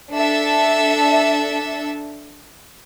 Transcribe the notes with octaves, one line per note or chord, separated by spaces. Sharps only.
D4 A4 E5